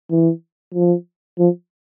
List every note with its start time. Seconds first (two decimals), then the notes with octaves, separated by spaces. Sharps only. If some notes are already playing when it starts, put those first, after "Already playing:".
0.11 E3
0.74 F3
1.39 F3